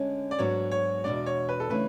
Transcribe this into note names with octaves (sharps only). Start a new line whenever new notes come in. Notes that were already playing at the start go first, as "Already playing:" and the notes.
Already playing: D3 G#3 C#4
D5
G#2 F#3 B3 D4 F#4 C#5
C#5
E2 B2 G#3 D4 D5
C#5
B4
A4
C#3 E3 A3 D4 B4